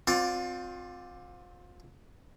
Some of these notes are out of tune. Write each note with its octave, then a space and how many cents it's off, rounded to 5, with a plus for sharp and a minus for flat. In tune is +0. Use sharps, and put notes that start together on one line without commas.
C4 +0 F4 +35 D5 +0